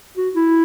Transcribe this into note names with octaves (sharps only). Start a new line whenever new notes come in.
F#4
E4